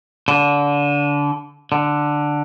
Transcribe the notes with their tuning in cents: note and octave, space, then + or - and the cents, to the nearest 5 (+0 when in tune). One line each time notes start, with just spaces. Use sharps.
D3 -25
D3 +5